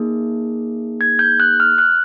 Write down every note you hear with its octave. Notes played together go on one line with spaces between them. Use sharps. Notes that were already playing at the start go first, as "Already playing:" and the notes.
Already playing: A#3 D#4 G#4
G#6
G6
F#6
F6
F#6